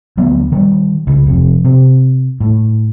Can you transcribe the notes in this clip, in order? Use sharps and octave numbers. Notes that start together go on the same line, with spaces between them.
D2 F#3 B3
D#3 G3
C#2
F1 F2
C3
A2